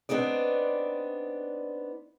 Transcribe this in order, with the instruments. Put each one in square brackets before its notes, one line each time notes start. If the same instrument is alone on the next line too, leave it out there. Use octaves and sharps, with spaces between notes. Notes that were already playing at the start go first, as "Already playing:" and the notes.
[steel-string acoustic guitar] B3 C4 D4 D#4 D5